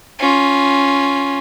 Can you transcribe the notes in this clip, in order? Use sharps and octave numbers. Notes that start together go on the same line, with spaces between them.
C#4 F4